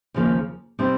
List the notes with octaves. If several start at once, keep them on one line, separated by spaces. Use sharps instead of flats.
D#2 C#3 F3 A#3
B2 G3 C4 D#4